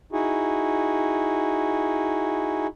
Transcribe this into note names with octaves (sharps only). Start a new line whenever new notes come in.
D#4 E4 F#4 G#4